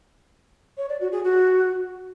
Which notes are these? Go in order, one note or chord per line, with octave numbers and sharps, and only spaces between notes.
C#5
D5
F#4
G#4
F#4